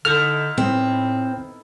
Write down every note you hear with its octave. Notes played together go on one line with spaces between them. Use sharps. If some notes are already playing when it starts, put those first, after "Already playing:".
D3 D#4 E4 A4 F6
A2 C4